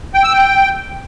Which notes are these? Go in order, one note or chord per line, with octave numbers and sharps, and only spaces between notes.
G5
E6
G5